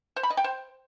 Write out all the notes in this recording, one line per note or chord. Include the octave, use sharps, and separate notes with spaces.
C5
B5
D#5
G5
C5